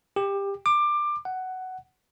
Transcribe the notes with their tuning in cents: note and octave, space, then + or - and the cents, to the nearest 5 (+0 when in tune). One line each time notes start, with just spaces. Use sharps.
G4 +20
D6 +20
F#5 +10